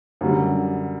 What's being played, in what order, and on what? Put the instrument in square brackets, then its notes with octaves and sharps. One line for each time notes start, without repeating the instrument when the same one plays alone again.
[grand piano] F#2 D3 G3